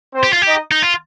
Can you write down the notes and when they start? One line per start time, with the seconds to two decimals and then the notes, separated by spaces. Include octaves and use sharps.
0.13 C4 C5
0.23 G4
0.33 F4
0.42 G4
0.47 D#4 D#5
0.71 D#4
0.82 F4